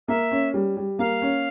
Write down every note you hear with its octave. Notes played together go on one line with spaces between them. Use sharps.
A#3 E5
C#4
G3
G3
A#3 F5
C#4